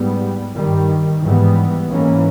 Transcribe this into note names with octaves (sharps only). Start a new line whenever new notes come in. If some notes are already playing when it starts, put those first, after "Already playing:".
Already playing: G#2 G3 B3
G2 D#3 G3
G#2 E3 G3 B3
G#2 E3 A#3 C#4